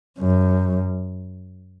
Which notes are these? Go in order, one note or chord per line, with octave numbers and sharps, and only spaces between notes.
F#2